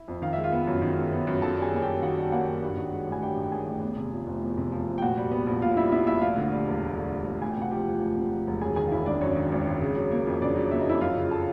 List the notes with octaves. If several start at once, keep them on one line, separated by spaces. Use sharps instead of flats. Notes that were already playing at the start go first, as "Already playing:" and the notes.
Already playing: E4 E5
F2
D#3 F5
G#3 E5
F4 F5
B3
F#2
D#3
G#3
B3
F#2
D#3 A4 A5
G3
G#4 G#5
A#3 G#5
F#2 G4 G5
D#3 F#4 F#5
G3 G5
A#3 F#4 F#5
F#2
G2
D#3
G#3
A1
G#5
G2 G4 G5
D#3
G5
G#3 G#4 G#5
A1
E2
C3
F3
F1
E2
C3
F3
F1
G5
A#2 F#4 F#5
G3
B3
A#1
A#2 F4 F5
G3 E4 E5
B3 E4 E5
A#1 E4 E5
D2 F4 F5
D3
G3
E1
D2
D3
G3
E1
D2 G#5
G5
C3 F#5
F3 G4 G5
E1
D2
C3
F3
E1
F#2 G#4 G#5
D#3 G#4 G#5
F5
G#1 E4 E5
G#1 D4 D5
F#2 C#4 C#5
D#3
G#1
G#1
C#3
F#3
A#3
F2
C#3 D4 D5
F#3
A#3 E5
D#5
F2 E4 E5
F#2 F4 F5
C#3
A4 A5